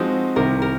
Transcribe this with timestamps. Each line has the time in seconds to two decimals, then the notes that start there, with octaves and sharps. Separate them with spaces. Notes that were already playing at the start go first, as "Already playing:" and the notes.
Already playing: F3 G#3 C4 D#4 F#4
0.36 C2 C3 D#3 A#4
0.62 A#4